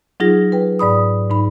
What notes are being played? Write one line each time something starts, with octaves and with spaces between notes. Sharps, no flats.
F#3 D#4 F4 G#4 A#6
B4 G5
G#2 D5 B5 D#6
G#2 D#4 B5